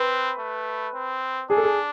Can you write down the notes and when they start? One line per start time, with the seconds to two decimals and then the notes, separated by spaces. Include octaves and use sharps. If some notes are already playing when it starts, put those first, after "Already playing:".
Already playing: C4 B4
0.39 A3
0.94 C4
1.50 D4 G#4
1.57 A4
1.64 G#4